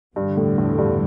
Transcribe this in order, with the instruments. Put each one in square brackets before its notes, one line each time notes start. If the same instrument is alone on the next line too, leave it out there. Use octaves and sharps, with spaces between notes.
[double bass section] E2 D3 G3 [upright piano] G2
[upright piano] A2
A2
G2